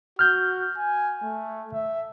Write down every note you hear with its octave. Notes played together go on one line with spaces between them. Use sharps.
F#4 F6 G6
G#5
A3
E5